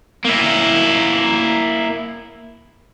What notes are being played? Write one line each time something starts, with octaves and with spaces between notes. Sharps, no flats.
A#3 E4